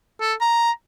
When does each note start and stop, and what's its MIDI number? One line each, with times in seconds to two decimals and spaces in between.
0.21 0.33 69
0.41 0.71 82